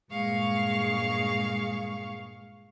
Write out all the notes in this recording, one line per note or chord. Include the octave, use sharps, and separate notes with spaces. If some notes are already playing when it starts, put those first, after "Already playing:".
G2 A#2 G#3 G#4 F5 C#6